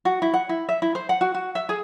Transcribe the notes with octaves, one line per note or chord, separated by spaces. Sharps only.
F#4
E4
F#5
E4
E5
E4
C5
F#5
F#4
F#4
E5
G#4